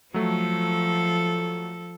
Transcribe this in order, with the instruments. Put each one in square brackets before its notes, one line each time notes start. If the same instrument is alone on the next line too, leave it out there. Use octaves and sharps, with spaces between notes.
[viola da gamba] F3 A4 [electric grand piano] F#3 A3